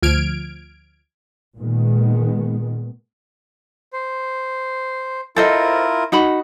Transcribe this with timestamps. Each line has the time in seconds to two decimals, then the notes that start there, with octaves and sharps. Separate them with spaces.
0.03 D2 F3 F6 G#6 D7
1.58 A#2 D#3 G#3 B3
3.93 C5
5.36 E4 F4 A4 A#4 C5 D#5
6.12 D#4 F#4 B5